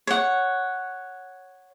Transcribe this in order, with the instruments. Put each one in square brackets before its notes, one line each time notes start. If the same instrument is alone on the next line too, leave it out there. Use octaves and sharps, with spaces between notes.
[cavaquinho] C#5 F#5